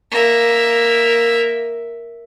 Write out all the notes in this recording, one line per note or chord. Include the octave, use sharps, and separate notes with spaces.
A#3 E5